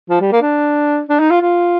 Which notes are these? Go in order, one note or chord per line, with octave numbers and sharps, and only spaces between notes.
F3
G3
A#3
D4
D4
D#4
F4
F4